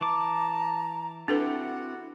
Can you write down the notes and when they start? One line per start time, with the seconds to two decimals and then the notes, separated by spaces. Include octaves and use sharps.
0.01 E3 A5 A#5 D6
1.28 C4 D4 E4 F#4 G4 A4 B4 F#5